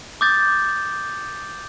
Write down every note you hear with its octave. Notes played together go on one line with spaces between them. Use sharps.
D6 D#6 G6 A6